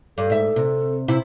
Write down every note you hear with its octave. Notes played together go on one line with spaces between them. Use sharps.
G2 A4
G#2 E5
C3
C3 E4